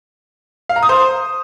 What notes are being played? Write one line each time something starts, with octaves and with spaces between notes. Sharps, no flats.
F5
A#5
D#6
C5